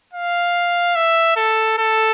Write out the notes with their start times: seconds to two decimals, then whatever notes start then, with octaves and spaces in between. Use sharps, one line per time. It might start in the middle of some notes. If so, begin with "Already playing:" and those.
0.14 F5
0.96 E5
1.37 A4
1.78 A4